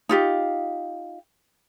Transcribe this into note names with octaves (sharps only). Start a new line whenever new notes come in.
D#4 F4 G4